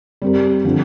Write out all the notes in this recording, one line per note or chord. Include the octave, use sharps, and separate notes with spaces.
G3 C4 G4 A#4
D3 F3 C4 F4